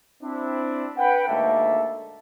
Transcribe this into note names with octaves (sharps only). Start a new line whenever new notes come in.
C4 D4 E4
B4 F#5 G5
D2 G#2 A#3 A4 E5